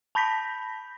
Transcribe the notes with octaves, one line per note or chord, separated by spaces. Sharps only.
A5 B5 G6 A#6 B6